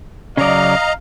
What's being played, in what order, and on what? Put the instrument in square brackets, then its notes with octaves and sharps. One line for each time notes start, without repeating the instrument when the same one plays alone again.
[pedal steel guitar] C#3 F#3 [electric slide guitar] C#4 D5 [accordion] D#5 A#5 [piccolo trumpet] F5